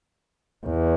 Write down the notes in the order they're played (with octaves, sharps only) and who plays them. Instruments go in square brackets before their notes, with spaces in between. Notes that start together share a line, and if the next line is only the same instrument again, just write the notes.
[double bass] E2